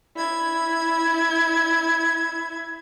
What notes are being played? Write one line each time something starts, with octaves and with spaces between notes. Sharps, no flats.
E4 G#6